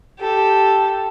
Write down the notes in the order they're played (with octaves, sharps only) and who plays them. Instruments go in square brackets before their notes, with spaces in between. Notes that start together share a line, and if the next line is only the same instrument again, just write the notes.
[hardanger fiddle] G4 A4